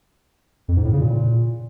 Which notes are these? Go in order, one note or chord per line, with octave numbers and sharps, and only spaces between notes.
F2
G#2
A2
C#3
A#2